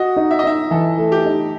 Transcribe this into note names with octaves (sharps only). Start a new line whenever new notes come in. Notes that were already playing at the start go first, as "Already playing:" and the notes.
Already playing: F#4 D#5
D#4
E5
D#5
D#4 E5
E3 A4
A3
G4
D#4